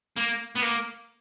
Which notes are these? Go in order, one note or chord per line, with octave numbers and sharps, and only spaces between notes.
A#3
B3
A#3